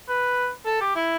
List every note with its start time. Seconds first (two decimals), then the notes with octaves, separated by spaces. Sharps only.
0.09 B4
0.66 A4
0.81 G4
0.96 E4